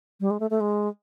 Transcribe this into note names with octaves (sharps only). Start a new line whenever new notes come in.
G3
G#3
A3
A3
G#3